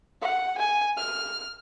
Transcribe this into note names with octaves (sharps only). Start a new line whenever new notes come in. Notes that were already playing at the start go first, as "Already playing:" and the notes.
F#5
G#5
F6